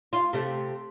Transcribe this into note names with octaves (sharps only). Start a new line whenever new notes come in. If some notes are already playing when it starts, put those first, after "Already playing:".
F4
C3 A3